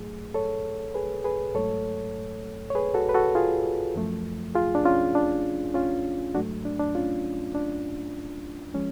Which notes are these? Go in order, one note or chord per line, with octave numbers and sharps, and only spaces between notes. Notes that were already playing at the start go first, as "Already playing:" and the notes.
Already playing: G#2 F#3 A3 G#4
A4 C#5
G#4 B4
G#4 B4
G#2 F#3 A3 A4 C#5
C#5
G#4 B4
F#4 A4
B4
F#4 A4
F4 G#4
F#2 F3 A3
F4 G#4
D4
C#4 F4
D4
C#4 F4
G#2 F#3 A3 D4 F#4
D4
D4
C#4 F4
D4
F3 G#3 C#4